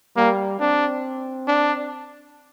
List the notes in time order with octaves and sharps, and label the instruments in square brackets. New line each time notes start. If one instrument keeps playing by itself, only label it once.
[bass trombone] G3 [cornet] A#3
[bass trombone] C4 [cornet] D4
[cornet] D4